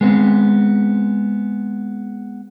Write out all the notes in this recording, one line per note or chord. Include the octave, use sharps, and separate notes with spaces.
G#3 B3 C4